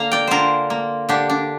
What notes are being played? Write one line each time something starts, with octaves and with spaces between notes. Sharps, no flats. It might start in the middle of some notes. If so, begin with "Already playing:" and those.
Already playing: D3 A#3 F5 A#5
D5 G5
D3 F4 A#4 C5
A#3
D3 D4 G4
D4